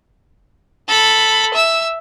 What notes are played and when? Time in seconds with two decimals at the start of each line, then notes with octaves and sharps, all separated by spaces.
0.88 A4 B5
1.54 E5 E6